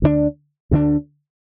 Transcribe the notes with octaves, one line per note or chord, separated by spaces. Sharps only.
D2 D3 G#3 D4
D2 D3 G#3 D4